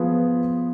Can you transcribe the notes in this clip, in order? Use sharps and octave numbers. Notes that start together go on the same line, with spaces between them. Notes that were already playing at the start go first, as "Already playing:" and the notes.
Already playing: F3 B3 F4 G#4 B4